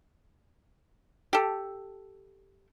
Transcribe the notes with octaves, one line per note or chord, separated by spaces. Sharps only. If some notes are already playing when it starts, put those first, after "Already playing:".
G4 A4